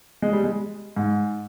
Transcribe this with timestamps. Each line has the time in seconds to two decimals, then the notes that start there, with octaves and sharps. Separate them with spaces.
0.22 G#3
0.33 G3
0.44 G#3
0.96 G#2